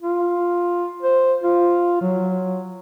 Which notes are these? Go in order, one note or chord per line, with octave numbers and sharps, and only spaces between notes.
F4
C5
F4
F#3